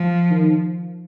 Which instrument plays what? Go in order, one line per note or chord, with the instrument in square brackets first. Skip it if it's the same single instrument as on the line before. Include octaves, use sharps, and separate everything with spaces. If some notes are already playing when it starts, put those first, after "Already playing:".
Already playing: [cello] F3
[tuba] D#3